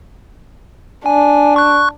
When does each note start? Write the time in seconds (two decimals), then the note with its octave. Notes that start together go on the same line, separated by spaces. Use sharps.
1.06 D4 G#5
1.56 C#6 F#6